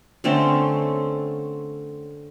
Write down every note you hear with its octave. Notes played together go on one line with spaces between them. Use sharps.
D3 A3 C4 C#4